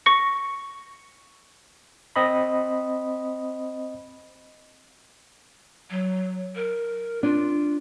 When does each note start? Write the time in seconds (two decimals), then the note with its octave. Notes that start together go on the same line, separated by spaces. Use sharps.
0.06 C#6 A#6 C#7
2.16 C4 D#5 B5
5.90 F#3
6.55 A#4
7.23 D4 F4